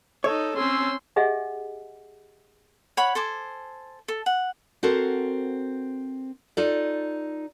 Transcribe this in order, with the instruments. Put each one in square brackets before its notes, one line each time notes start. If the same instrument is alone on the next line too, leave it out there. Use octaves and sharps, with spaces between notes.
[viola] D#4 A4 [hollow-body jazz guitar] C#5
[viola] C4 C#4 [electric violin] C6 E6
[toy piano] G4 G#4 D#5 E5 F#5 G#5
[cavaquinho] C#5 F#5 B5
A4 C5 G#5 D6
A4
F#5
[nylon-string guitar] C4 F#4 A4 A#4 C5
D#4 F4 A4 D5